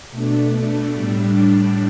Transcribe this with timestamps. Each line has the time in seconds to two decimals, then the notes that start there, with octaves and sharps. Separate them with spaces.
0.12 B2 A3 D4
0.93 A2 G3 D4